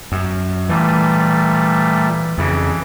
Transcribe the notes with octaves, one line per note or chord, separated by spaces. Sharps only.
F#2
A#2 E3 G3 A3
F2 C#3 E3